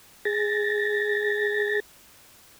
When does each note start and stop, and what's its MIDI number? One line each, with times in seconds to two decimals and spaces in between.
0.25 1.80 68
0.25 1.80 93
0.25 1.80 94